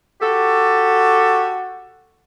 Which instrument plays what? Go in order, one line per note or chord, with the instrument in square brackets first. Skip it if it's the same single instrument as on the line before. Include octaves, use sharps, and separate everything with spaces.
[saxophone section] F#4 G4 A4